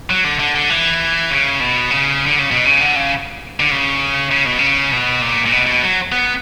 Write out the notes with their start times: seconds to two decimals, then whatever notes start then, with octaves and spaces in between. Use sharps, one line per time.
0.10 F#3
0.24 D3
0.39 D3
0.55 D3
0.70 E3
1.30 C#3
1.60 B2
1.90 C#3
2.26 D3
2.39 C#3
2.51 B2
2.65 C#3
2.81 D3
2.96 C#3
3.60 D3
3.71 C#3
4.31 C#3
4.45 B2
4.59 C#3
4.92 B2
5.21 A#2
5.46 A#2
5.52 B2
5.67 B2
5.82 F#3
6.12 B3